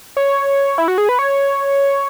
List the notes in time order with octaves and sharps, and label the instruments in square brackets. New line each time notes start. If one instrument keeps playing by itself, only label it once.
[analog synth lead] C#5
E4
F#4
G#4
B4
C#5